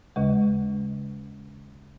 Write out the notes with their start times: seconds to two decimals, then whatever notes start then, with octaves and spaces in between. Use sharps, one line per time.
0.16 D#2 C#3 G#3